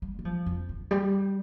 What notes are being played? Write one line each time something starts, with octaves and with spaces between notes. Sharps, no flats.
G3
G3
F3
F2
D3
G3